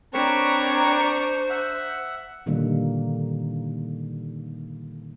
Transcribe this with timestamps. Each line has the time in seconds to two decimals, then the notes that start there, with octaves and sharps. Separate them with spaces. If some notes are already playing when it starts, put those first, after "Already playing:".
0.14 C4 D4 A#4 B4 C#5 A#5 C#6
0.84 C5
1.50 E5 F#5
2.46 A#2 D3 D#3 G3 A#3